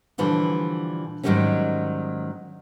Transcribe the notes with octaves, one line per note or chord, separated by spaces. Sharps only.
A#2 D3 E3 F3 G3
G#2 D#3 F#3 G3 A#3 C#4